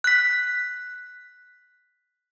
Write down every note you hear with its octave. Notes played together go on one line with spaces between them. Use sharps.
F#6 B6